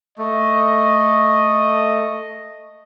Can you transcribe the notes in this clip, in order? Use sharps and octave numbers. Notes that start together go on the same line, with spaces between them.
A3 D#5